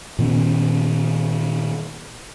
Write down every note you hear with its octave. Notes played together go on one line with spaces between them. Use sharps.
A#2 D#3 B3 C#4